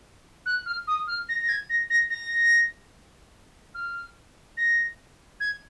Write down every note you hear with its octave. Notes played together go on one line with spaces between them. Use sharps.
F#6
F6
D#6
F6
A#6
A#6
G#6
A#6
A#6
A#6
F6
A#6
G#6